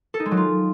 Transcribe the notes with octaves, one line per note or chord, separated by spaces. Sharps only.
A4
D#4
G#3
F#3
F4